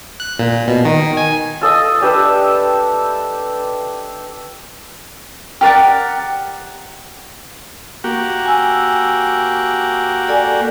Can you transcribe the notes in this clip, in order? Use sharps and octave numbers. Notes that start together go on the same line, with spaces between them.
F#6
A#2
B2
D#3
G#5
F4 A4 D#5
D4 G4 B4 E5
G4 A#4 D5 F#5
A#3 F#4 G4
G#5 E6
A4 D5 G#5